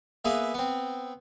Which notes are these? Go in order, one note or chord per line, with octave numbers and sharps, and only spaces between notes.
A#3 B3 G#4 B4 E5
B3 C4